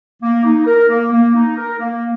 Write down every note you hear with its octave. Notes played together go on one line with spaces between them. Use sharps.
A#3
D#4
A#4
A#3
A#3
D#4
A#4
A#3